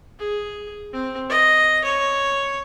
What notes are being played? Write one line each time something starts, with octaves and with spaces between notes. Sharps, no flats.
G#4
C4
D#5
C#5